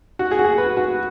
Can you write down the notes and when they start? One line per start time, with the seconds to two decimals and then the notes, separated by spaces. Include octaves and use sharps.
0.19 F#4
0.31 G#4
0.39 F#4
0.44 G#4
0.58 B4
0.77 F#4